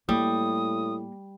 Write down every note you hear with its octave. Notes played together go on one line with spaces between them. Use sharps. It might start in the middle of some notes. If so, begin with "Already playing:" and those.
A2 G3 A#3 D#6